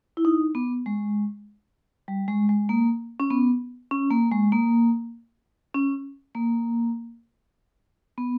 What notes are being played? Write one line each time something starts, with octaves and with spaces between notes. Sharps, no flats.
E4
D#4
B3
G#3
G3
G#3
G#3
A#3
C#4
B3
C#4
A#3
G#3
A#3
C#4
A#3
B3